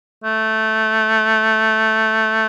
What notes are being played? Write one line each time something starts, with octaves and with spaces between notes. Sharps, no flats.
A3